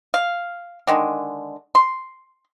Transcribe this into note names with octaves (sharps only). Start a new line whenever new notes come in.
F5
D3 D#3 G#3
C6